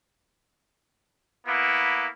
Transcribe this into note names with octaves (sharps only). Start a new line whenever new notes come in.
A#3 B3 E4